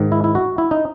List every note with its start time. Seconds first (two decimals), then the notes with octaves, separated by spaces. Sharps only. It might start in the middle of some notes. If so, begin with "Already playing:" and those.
Already playing: G#2 D#3
0.12 E4
0.24 E4
0.35 F#4
0.58 E4
0.71 D#4